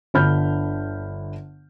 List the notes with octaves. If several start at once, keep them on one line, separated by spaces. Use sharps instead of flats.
G1 D3 B5 F6 G6